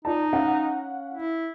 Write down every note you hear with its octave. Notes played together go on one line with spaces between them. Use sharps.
D#4 F4 D5 A5
C#4 F5 F#5
E4